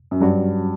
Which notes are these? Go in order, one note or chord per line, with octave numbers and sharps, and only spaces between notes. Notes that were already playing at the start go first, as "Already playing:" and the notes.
F#2
G2 F#3 C#4 F#4